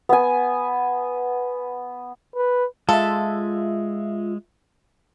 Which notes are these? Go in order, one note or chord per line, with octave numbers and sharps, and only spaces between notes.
B3 G#5
B4
G#3 F4 A4 E5